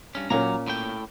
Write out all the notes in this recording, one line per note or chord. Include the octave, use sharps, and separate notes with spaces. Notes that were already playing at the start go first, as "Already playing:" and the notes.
G2 C#4
A#2 F#3 A#3 C#4 A#5
A2 G5